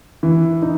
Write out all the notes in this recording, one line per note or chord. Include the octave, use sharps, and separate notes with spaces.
E3
D#4